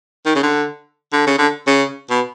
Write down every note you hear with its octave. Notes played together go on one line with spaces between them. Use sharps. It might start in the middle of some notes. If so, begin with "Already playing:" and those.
D#3
C#3
D3
D3
C#3
D3
C#3
B2